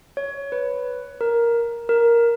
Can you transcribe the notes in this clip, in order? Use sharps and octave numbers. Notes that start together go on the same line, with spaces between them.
C#5
B4
A#4
A#4